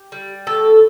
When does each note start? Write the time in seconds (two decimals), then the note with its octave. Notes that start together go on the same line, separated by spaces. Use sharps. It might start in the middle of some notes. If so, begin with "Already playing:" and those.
Already playing: G4
0.12 G3
0.47 B2 A4